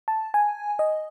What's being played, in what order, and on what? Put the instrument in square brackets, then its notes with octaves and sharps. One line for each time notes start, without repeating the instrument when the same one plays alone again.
[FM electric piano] A5
G#5
D#5